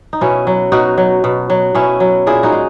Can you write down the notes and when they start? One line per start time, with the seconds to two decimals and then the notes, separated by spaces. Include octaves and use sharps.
0.13 D#4
0.21 B2 C#4 E4
0.47 F#3
0.72 B2 D#4 F#4
0.98 F#3
1.24 B2
1.50 F#3
1.75 B2 C#4 E4
2.00 F#3
2.27 A#2 E4 G#4
2.43 D#4 F#4
2.52 G#3